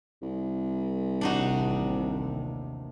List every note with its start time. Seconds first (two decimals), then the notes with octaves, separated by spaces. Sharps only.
0.22 C2
1.21 A1 D#2 C3 D4 D#4 F#4